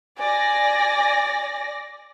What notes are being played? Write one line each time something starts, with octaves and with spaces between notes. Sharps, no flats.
D5 G#5 A#6